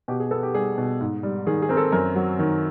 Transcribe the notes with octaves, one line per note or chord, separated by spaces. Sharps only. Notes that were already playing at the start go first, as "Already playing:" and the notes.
B2 G4
G#4
B3 A4
G4
G3 G#4
B2
G#2
G3
D#3 G#4
G#4
C4 A#4
A4
F#2 A#4
F#3
D#3